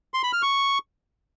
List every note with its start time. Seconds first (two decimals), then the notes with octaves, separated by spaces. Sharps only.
0.14 C6
0.23 B5
0.33 F6
0.42 C#6